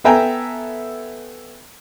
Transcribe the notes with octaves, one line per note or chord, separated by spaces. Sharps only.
B3 A4 E5 G5 G#5 A#5